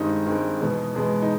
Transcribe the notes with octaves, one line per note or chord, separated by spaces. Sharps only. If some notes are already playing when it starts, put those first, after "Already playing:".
Already playing: G2 D#3 G#3 C4 D#4
G2 D#3 G#3 C4
E2 B2 G#3 B3
E2 B2 G#3 B3
D#4